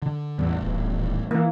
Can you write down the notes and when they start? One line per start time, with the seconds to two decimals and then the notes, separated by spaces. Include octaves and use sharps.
0.02 D3
0.38 A1 E2 G3 B3
0.62 D#1
1.31 E3 A#3